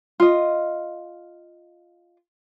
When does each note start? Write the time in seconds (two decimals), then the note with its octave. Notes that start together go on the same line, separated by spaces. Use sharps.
0.20 F4 D#5